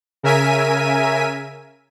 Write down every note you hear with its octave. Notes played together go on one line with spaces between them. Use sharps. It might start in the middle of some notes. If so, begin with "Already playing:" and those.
C#3 A#4 E5 G#5 B6 D#7